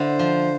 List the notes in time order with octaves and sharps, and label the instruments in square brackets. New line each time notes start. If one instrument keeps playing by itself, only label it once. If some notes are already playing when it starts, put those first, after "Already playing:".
Already playing: [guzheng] D3 E4 [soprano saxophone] C5
[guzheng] F3